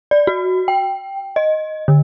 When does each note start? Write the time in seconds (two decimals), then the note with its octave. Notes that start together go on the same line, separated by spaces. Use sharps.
0.11 D5
0.27 F#4
0.68 G5
1.36 D#5
1.88 D3